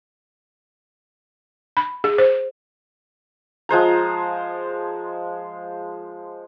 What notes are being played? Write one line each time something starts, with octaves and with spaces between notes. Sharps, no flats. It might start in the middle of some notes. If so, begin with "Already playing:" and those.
B5
G#4
C5
F3 G#3 C5 A#5